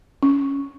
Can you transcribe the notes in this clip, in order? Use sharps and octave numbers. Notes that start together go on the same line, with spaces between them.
C#4